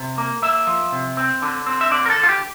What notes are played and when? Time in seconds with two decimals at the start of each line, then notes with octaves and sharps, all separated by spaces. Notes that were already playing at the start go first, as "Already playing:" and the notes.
Already playing: C3
0.18 A#3
0.42 A#3 E5
0.67 F3
0.92 C3
1.17 C4
1.42 D3
1.66 C4
1.81 E5
1.90 D3 D5
2.06 A#4
2.10 A4
2.16 D3
2.23 F4
2.29 G4